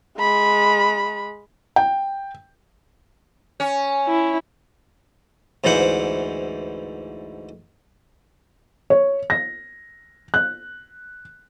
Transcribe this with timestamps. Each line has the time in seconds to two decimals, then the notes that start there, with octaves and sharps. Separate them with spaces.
0.18 G#3 B5
1.76 G5
3.60 C#4
4.07 E4
5.64 D2 G#2 E3 C5 F#5
8.90 C#5
9.30 A#6
10.34 F#6